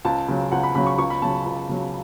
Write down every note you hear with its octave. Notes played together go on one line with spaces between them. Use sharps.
C#2 A5
C#3 F#3
C#2 F#5
B5
C#3 F#3 B5
C#6
C#2 C#6
B5
C#3 F#3 A5
C#2
C#3 F#3